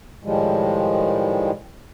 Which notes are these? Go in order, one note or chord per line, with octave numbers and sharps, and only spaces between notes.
A2 D#3 F3 G3 G#3